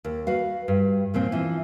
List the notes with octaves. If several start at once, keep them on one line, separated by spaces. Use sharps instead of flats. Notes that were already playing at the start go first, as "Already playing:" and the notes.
D#2
F#4 B4 F5
G2
D#2 A#2 F3 C4
E3 F3 D4